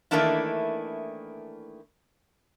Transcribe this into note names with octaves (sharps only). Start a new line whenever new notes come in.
D#3 E3 A3 A#3 D4 E4